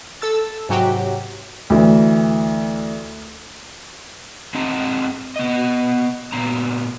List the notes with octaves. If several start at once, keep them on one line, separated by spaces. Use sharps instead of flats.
A4 E6 A6
G#2 C3 F#3 F#4 G4
D2 E3
C4 G#4 D#5 F#5 A5 A#5
B3 D#5
A#2 B3 A#5